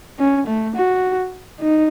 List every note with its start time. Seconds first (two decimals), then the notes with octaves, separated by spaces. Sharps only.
0.19 C#4
0.47 A3
0.75 F#4
1.60 D#4